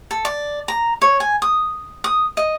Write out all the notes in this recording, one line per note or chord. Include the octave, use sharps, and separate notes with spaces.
A4
D5
A#5
C#5
G#5
D#6
D#6
D#5